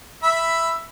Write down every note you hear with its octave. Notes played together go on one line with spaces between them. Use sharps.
E5 B5